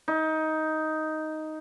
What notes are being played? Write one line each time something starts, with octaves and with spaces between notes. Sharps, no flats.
D#4